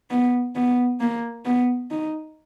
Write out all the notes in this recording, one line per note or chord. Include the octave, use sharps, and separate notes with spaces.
B3
B3
A#3
B3
D#4